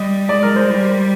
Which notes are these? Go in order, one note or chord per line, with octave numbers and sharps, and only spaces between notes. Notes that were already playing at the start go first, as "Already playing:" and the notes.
Already playing: G3 D#5
G#3 D5
A#4
C5
G3 C5